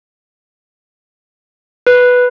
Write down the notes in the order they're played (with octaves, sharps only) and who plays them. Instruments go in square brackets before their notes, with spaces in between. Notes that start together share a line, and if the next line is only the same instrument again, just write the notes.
[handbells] B4